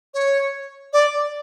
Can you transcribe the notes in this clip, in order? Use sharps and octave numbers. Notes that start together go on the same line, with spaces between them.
C#5
D5